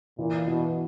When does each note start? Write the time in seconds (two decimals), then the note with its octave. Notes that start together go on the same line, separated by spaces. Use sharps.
0.19 A#2 E3
0.47 B2 E3